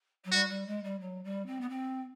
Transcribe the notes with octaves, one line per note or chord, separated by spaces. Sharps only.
F#3
G3 F#4
G3
G#3
G3
F#3
G3
C4
B3
C4